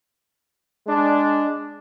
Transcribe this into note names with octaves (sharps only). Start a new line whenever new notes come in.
G#3 D4